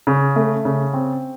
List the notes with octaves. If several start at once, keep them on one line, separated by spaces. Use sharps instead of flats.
C#3
A3
C#3
C4